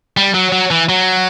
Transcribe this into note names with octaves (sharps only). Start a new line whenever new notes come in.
G3
F#3
F#3
E3
F#3